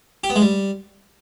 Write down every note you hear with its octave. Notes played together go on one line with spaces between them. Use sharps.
G4
B3
G#3
G3